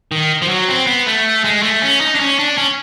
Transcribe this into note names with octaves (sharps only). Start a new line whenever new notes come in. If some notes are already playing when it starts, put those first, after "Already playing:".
D#3
F3
F#3
C4
B3
A3
G#3
A3
C#4
D#4
D4
C#4
D4
C#4